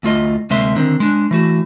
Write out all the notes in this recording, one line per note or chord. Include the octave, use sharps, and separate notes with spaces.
D2 A3 F4 D#5
D2 C3 G#3 A#3 E5 C6
D3 D#3 C4
G#3 D4
E3 A3 F#4